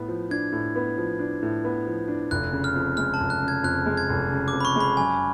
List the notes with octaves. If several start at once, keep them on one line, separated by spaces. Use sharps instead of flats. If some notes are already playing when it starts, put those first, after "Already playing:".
Already playing: A2 B3
F3
D4 G#6
A2
B3
F3
D4
A2
B3
F3
D4
F1 F#6
C#3
F6
F2
G#3 F6
A5
F1
F#6
C#3
G#6
F2 F#6
G#3
G#6
F1
C#3
D6
F2
B5
C#6
G#3 B5
F#2 G#5